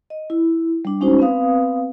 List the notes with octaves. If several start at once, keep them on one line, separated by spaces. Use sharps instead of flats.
D#5
E4
G3 D4
G#3 C#4 D#4 F#4 C5
B3 C4 B4 F5 D#6